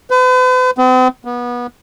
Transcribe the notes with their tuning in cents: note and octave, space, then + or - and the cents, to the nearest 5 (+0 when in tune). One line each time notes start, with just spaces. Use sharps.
B4 +45
C4 -45
B3 -25